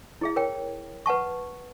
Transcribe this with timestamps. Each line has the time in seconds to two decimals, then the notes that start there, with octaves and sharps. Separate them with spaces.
0.21 E4 G#4 E5
0.36 A#4 C#5 G5
1.06 B4 F#5 A5 C#6